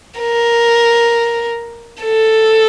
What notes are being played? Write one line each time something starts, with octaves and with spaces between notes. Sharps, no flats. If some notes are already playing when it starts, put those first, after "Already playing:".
A#4
A4